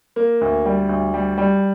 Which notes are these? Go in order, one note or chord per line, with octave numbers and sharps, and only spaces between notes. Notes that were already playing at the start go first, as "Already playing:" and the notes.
A#3
D2
G3
D2
G3
G3